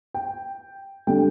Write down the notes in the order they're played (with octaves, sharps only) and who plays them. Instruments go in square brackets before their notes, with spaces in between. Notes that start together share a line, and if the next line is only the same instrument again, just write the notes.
[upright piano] G5
D3 G3 G5